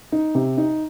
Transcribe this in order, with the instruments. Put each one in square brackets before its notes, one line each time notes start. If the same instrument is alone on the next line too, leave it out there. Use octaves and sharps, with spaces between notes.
[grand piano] D#4
C3
D#4